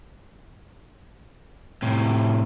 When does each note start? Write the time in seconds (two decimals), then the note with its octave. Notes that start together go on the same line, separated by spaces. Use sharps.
1.82 A2 C3